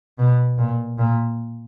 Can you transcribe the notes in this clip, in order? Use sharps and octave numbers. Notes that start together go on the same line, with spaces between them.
B2
A#2
A#2